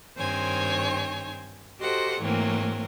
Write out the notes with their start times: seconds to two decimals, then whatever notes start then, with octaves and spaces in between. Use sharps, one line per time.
0.17 G2 D#3 C4 C5 C#5 G#5
1.79 F#4 G4 A4 C5 D#5 F#5
2.20 G#2 E3 F#3 A3 A#3 C4